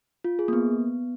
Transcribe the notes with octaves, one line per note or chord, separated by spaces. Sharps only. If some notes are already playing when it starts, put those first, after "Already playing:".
F4
G#4
A#3
B3